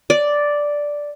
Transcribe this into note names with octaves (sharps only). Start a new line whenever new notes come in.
D5